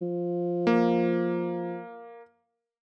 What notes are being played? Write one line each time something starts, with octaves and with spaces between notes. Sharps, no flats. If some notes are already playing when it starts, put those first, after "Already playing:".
F3
A#3